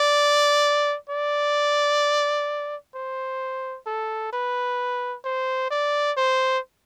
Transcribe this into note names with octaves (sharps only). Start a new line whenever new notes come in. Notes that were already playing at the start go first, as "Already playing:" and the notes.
Already playing: D5
D5
C5
A4
B4
C5
D5
C5